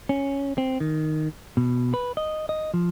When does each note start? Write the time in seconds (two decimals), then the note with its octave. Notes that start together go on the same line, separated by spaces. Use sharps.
0.09 C#4
0.58 C4
0.80 D#3
1.57 B2
1.94 B4
2.17 D#5
2.49 D#5
2.74 F3